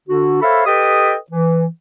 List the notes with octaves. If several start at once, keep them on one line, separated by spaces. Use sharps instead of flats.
D3 D4 F#4
A4 C5 C#5 E5 F5 B5
G4 A4 B4 D#5 G5 D#6
E3